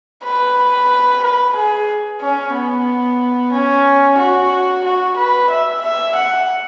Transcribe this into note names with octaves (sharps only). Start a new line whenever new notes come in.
B4
B4
G#4
C#4
B3
C#4
F#4
F#4
B4
E5
E5
F#5